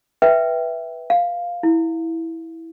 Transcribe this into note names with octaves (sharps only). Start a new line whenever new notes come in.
B4 E5 G5
F5
E4